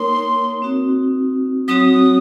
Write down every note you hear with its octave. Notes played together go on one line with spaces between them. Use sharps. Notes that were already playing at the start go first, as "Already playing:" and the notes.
Already playing: A#3 D#4 A#4 C#5 C6
C4 D#4 F#4
F#3 C4 F#4 C#5 D#6